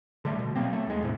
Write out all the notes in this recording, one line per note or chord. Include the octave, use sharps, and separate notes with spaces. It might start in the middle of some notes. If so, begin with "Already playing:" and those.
D3 G3 A3
B2
F#3 A#3 C4
A3
D#2 G#3
A2 C3